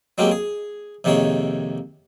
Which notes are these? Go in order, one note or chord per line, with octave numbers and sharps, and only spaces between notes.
F#3 G#3 A#3 C4 C#4 G4
G#4
F2 C3 D#3 A#3 G#4 C#5